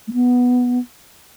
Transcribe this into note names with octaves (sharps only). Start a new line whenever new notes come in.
A3
B3